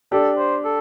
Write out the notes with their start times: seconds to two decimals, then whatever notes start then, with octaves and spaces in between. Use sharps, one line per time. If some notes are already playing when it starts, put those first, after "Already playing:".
0.12 D4 G4 A4
0.38 C5
0.64 A4